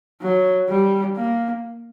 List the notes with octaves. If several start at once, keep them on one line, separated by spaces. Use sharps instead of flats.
F#3
G3
A#3